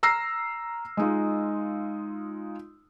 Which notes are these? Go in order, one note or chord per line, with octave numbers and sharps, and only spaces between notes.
A#5 E6 F6 A#6 C7
G#3 D#4 F4